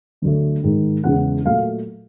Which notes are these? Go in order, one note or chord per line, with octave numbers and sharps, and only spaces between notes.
D2 D3 F#3 A3
G#2 D#3 G#3
E2 C#3 E3 G#3 F#5
A#2 F#3 A3 F5